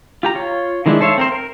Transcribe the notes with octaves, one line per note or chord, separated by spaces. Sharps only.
F4 G4 A#5
F4 C#5
D#3 E3 G#3 D4 E4
A4 C5 C#5 E5 F5
C4 A#4 C5
A#4